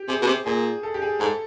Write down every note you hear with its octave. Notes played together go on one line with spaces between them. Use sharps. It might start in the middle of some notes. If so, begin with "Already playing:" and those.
Already playing: G4
C3 G#4
B2
C3
A#2 G#4
A4
G4
G#4
G#2 A4